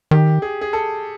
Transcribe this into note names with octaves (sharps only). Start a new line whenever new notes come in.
D#3 G4
G#4
G#4
A4